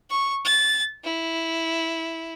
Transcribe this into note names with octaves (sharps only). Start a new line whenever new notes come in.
C#6
A6
E4